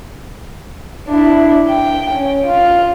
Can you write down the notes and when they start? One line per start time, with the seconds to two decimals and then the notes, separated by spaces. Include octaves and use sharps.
1.08 D4 E4
1.69 G5
2.12 C#4
2.47 F4